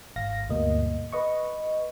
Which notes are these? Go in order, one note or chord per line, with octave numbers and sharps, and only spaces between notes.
G#1 F5 A#6
D2 G2 B2 A#3 D#5
B4 D#5 C#6